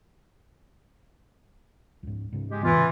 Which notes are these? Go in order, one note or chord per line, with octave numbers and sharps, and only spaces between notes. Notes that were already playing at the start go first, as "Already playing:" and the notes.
C#2 G#2
G#2 C#3
G#3 G4
E2 G#2 E3 B3 F4
A2 C#3